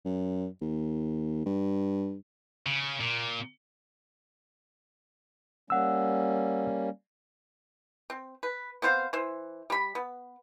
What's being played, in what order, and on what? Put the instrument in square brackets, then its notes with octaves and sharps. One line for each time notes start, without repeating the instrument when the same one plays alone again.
[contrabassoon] F#2
D#2
G2
[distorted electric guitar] C#3
A#2
[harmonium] G3 A#3 C#4 [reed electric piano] F#5 E6
[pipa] C4
B4
B3 C4 C5 F5
E3 C5
G3 B5
B3